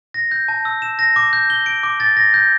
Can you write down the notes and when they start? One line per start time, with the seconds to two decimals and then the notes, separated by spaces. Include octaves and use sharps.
0.14 A#6
0.31 G6
0.48 A5
0.65 E6
0.82 E7
0.99 A#6
1.16 D6
1.33 G6
1.50 G7
1.66 D7
1.83 D6
2.00 A6
2.17 A#6
2.34 G6